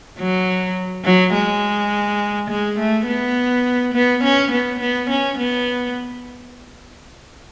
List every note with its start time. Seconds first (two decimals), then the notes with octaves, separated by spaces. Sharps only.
0.19 F#3
1.05 F#3
1.34 G#3
2.50 G#3
2.78 A3
3.07 B3
3.94 B3
4.24 C#4
4.51 B3
4.80 B3
5.10 C#4
5.38 B3